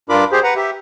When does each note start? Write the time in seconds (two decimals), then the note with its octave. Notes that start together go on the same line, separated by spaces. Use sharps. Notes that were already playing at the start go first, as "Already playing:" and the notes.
0.09 G2 D4 F4 A#4 B5 D6
0.32 G4 G#4 C5
0.44 B4 F#5 A#5
0.56 G4 E5